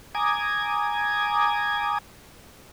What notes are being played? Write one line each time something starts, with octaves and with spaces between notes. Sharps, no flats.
G#5 A#5 D6 D#6 G#6